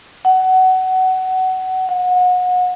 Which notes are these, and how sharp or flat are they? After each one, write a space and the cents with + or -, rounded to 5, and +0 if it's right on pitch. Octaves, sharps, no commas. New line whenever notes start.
F#5 +20
F#5 -30